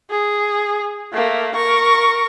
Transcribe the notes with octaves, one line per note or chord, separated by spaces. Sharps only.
G#4
A3 A#3
A#4 C#6